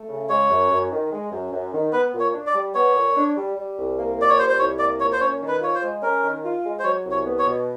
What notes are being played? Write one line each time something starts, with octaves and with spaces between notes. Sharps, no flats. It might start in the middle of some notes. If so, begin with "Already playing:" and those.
Already playing: A3
C#3
G#3 C#5
F#2
F#2
D#3
G#3
F#2
F#2
D#3
B3 B4
A#2
C#5
D4
D5
G3
B3 C#5
A#2
D4
G3
G3
C2
A#3
A#2 D5
C#5
G3 C5
C5
C2 C#5
A#3 D5
A#2 C#5
C5
C#4 C#5
D#3
B4
F4 C#5
C5
G#3
C#4 A#4
D#3
F4
G#3
C5
F#3 C#5
C2
C#5
B3
C#5
B2